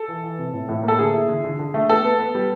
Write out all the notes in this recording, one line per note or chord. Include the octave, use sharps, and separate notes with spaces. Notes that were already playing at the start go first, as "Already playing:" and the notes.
Already playing: A4
E3
E3
C3
A2
A2
A#3 A4
D3 G#4
E4
D3
D3
D3
A3
B3 A4
B3
B3
G3